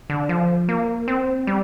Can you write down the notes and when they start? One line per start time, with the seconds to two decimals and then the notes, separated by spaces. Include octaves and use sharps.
0.10 D3
0.29 F3
0.69 A#3
1.08 C4
1.47 G3